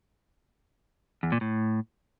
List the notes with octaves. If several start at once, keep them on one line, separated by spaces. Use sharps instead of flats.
E2
A#2
A2